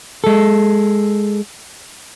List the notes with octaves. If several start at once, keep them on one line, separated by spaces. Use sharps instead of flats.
G#3 A4